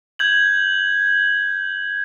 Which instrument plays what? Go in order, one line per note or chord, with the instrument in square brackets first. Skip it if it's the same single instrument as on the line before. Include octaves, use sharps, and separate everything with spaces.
[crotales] G6 G#6 F#7